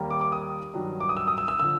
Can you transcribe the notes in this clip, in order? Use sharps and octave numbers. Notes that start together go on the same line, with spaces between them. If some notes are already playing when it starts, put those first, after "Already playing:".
Already playing: D#2 D#3 G3 A#3
D6
D6
D#6
G2 D#3 F#3
D6
D#6
E6
D#6
E6
E6
D3 F3 E6